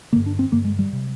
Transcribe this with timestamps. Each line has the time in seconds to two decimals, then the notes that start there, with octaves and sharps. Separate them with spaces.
0.13 G2 D3 A#3
0.26 D4
0.39 C4
0.52 G2 D3 A#3
0.65 G#3
0.79 G3
0.93 C3